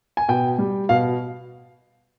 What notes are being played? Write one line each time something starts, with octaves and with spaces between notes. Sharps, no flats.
G#5
B2 G5
G3
B2 F5